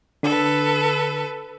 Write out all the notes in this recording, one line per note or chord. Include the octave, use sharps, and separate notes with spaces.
D3 A4 B4